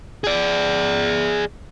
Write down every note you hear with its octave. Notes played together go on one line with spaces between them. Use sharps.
G#4 D5